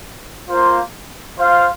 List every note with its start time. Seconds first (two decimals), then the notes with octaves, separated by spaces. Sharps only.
0.49 A#3 F4 C5
1.37 F4 C5 F5